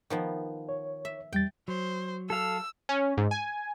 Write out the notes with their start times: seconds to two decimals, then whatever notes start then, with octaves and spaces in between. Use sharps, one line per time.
0.10 D#3 F3 B3
0.69 C#5
1.05 E5
1.33 E2 G3 G5 A6
1.68 F#3 C5
2.30 A4 F5 E6
2.89 C#4
3.17 G#2
3.31 G#5